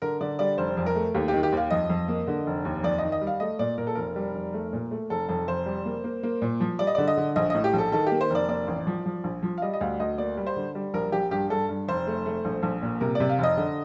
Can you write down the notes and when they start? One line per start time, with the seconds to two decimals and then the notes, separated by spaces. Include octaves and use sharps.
0.02 D3 A#4
0.21 D3 D5
0.39 G3 D5
0.58 F1 C5
0.77 F2
0.86 A#4
0.96 A3
1.14 D#2 G4
1.28 G4
1.34 D#3
1.43 G4
1.52 D#2 F5
1.71 F2 D#5
1.90 F2
2.08 A#3
2.28 D3
2.47 F1
2.65 D#2
2.83 F2 D5
2.98 D#3 D#5
3.12 D#5
3.21 G3
3.27 F5
3.40 A3 D#5
3.59 A#2 D5
3.78 A#2 A#4
3.87 A4
3.95 F1 A#4
4.16 G3
4.35 F1
4.54 A3
4.73 A#2
4.91 A3
5.10 F1 A4
5.29 F2 A4
5.48 F1 C5
5.66 G3
5.85 A#3
6.04 A#3
6.23 A#3
6.42 A#2
6.60 F3
6.79 G3 D5
6.87 D#5
6.95 D3 D5
7.08 D#5
7.17 D3
7.36 A#1 D#5
7.50 A2 D#5
7.64 G4
7.74 A#1 A4
7.92 D#3 A4
8.07 G4
8.12 A#3
8.21 C5
8.30 F1
8.35 D5
8.49 A#3 D5
8.68 A1
8.87 F3
9.06 F3
9.24 A#1
9.43 F3
9.58 F5
9.62 G3 D#5
9.73 D#5
9.81 D2 F5
10.00 D2 D#5
10.18 A#3 D5
10.37 G3
10.47 C5
10.56 D3
10.75 G3
10.94 A#1 A#4
11.12 A#1 G4
11.31 G2 G4
11.50 G2 A4
11.69 G2
11.88 F1 C5
12.07 A3
12.26 A3
12.45 A#1
12.63 A#1
12.82 A#2
13.01 C3 A#4
13.15 D5
13.20 C3
13.29 F5
13.39 F1 D#5
13.57 D3